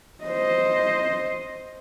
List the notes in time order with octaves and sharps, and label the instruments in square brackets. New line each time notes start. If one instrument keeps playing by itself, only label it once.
[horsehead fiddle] C5 D#5